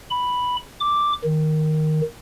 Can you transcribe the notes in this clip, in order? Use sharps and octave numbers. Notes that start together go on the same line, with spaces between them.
B5
D6
D#3